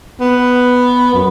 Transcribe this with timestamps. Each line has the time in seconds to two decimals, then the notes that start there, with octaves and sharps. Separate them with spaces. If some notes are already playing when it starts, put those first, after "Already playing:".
0.20 B3
1.14 F#2